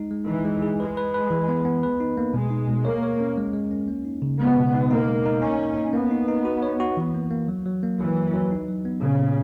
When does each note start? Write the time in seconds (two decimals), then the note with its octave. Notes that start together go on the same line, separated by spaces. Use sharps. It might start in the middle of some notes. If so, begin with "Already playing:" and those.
Already playing: G#3 D#4
0.11 G#3
0.28 E3 D#4
0.45 G#3
0.62 G#4
0.79 G#3 B4
0.97 B4
1.14 B4
1.31 E3
1.48 B3
1.65 B3
1.83 B4
2.00 D#4
2.17 A#3
2.34 B2 G#3
2.51 D#4
2.68 B2
2.85 A#3 C#5
3.03 C#5
3.20 C#4
3.37 G#3
3.53 G#3
3.71 C#4
3.88 A#3
4.05 D#4
4.22 C#3
4.39 G#3 B3
4.57 B2
4.74 D#4
4.90 A#3 D#4
5.08 G#3
5.26 D#4
5.42 C#4 D#4
5.59 A#3
5.77 D#4
5.93 A#3 B3
6.11 D#4
6.28 D#4
6.45 F#4
6.63 C#5
6.80 F#4
6.97 E3
7.14 A#3
7.31 A#3
7.48 F#3
7.66 F#3
7.83 A#3
7.99 E3 F#3
8.16 F#3
8.34 F#3
8.51 D#4
8.69 F#3
8.85 B3
9.02 A#2 C#3
9.19 A#2